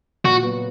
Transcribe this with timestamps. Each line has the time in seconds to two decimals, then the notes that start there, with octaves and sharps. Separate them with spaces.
0.24 A#2 F#4
0.43 F#3 B3